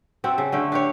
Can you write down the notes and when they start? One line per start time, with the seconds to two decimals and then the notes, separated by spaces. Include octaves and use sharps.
0.24 C4 F#4 A4 E5
0.38 C#3
0.52 D3 A3 G5
0.72 D4 G4 C#5